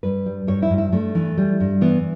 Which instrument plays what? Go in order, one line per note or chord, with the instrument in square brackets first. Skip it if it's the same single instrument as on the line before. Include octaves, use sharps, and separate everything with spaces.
[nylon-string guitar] G2 B4
G3
G2 C#5
E4
G2
E4
G2 A3
E3
G3
G2
E3 B3